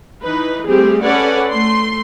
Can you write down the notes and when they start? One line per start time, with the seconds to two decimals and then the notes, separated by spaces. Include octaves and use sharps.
0.22 E3 D#4 B4
0.65 G3 A3 C4 G4 G#4
1.03 C#4 A4 B4 D5 F#5 G#5
1.48 A3 C6